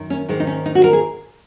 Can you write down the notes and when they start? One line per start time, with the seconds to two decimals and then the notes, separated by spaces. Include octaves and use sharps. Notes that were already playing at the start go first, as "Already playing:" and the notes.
Already playing: F#2 D#3
0.10 C#4
0.29 G#2 D#3 G#3
0.40 D#4
0.47 C#4
0.66 D#4
0.75 F#4
0.84 A#4
0.93 G#4